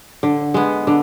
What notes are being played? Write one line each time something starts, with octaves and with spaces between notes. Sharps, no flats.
D3
G#3 B3
D3